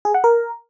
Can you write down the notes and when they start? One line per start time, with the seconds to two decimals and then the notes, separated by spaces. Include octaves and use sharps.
0.05 G#4
0.14 F#5
0.24 A#4